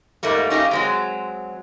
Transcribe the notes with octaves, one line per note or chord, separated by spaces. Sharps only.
G#2 G3 A3 A#3
C#4 D#4 G4 F5
F#3 G#3 C4